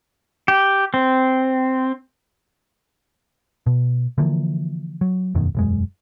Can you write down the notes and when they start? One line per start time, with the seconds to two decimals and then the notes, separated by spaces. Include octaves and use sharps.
0.48 G4
0.94 C4
3.67 B2
4.18 D3 E3 F3 A#3
5.01 F#3
5.35 E1 F#2 B2 D#3
5.55 E1 F#2 G#3